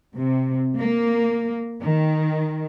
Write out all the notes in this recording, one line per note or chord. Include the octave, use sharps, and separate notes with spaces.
C3
A#3
D#3